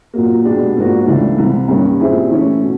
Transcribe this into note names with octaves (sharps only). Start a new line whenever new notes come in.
A#2 F#3 A#3
B2 G#3 B3 D4 G4
G#2 F3 A#3 D4 F#4
C#2 C#3 E3 A3 D4
C2 C3 E3
G2 D#3 G3 A#3 C#4
A#2 G3 C4 E4 G#4
E3 A3 C#4
B2